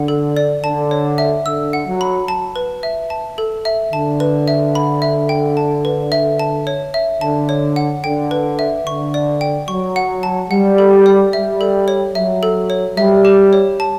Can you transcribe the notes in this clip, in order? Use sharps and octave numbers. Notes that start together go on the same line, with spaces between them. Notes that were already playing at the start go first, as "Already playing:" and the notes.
Already playing: D3 F#5
A4
D5
D3 A5
C#5
E5
D3 E6
F#5
F#3
B5
A5
B4
E5
A5
A4
E5
D3 A5
B4
E5
B5
E5
G5
A5
B4
E5
A5
C#5
E5
D3 A5
C#5
F#5
D3 G5
B4
E5
D3 C#6
D5
G5
F#3 C#6
F#5
A5
G3 F#5
A4
D5
G3 E5
A4
C#5
F#3 E5
A4
C#5
G3 E5
G4
C#5
A5